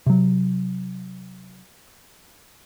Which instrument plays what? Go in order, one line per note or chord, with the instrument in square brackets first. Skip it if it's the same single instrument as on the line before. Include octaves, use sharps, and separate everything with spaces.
[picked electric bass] C3 F#3